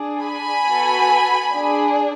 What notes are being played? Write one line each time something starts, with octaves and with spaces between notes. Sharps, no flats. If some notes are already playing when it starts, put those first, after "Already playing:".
Already playing: D4 G#4
G#5 B5
B3 F#4 A4
D4 G#4